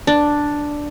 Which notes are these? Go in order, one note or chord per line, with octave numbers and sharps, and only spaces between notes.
D4